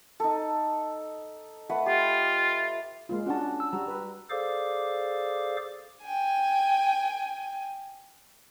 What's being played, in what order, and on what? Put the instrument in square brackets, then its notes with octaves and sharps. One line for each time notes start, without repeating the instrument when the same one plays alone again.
[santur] D#4 A4
A3 B4 F#5
[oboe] F4 [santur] G4
[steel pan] G#3 A#3 F4
[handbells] C#4 F#5 A5 [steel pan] D4 F#4
[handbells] E6
[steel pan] G3 F#4 [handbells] A#5
[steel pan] B4
[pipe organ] G#4 A4 C5 D5 F5 D6
[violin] G5 G#5